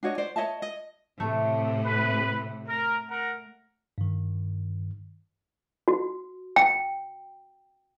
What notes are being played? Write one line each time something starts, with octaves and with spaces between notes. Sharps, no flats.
D4 F#4 C#5 D#5
C5 D5
C#5 D#5 E5 A5
D#5
A2 C3 A3
B4
A#4
A#4 F#5 A#5
G2 D#3
F#4
G5